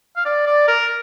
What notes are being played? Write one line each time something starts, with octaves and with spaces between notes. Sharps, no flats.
F5
D5
D5
A#4